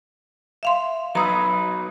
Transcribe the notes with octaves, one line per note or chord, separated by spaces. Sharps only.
E5 F5 C6
F#3 D#4 B4 A#5 D#6 E6